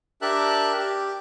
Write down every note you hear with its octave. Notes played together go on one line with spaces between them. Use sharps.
D4 G4 A#4 E5 A5 F#6
G4